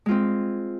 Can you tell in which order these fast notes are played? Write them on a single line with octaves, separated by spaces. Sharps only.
G#3 F4 C4